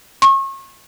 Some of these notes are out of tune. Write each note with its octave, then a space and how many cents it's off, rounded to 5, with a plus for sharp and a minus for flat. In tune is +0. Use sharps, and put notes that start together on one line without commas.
C#6 -35